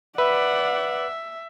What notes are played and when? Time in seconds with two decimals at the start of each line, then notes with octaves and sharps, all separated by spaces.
0.18 B4 D5 E5 F#5